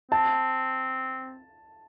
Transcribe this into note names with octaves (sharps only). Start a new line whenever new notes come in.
C4 A5